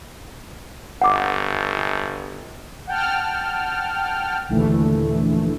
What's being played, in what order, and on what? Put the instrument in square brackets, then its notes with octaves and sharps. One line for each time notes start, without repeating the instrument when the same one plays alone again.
[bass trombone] G1 [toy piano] F#5 D6
[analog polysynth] F#5 G5 A5 F6
A#1 D#2 D3 E3 A3